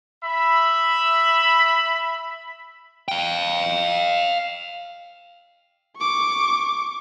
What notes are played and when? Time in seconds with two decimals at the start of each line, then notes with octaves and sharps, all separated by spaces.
0.24 E5 B5
3.08 F5 G5
5.98 C#6 D6